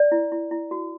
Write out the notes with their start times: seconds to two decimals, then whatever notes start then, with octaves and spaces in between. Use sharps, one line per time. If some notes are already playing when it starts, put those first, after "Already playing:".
Already playing: D5
0.12 E4
0.32 E4
0.51 E4
0.71 F#4